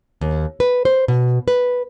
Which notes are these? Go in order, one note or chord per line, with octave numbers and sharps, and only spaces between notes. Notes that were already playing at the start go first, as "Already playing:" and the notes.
D#2
B4
C5
B2
B4